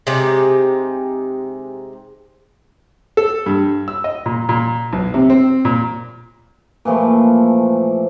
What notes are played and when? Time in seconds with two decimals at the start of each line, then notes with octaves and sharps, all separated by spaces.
0.07 C3 G#3 D#4 G4
3.17 A4
3.46 G2
3.88 E6
4.04 D#5
4.26 A#2
4.49 A#2
4.93 B1
5.14 C3
5.30 C4
5.65 A#2
6.85 A#2 E3 F3 A3